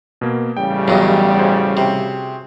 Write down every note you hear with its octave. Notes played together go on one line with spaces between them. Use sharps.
B2 A#3
A1 C#3 G3 G5
E2 G2 F#3 D#5
F#4 G#4 C5
C3